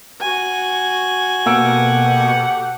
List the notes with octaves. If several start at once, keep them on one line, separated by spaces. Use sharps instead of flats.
F#4 G#5
B2 A#3 G4 A4 F#5 E6 D7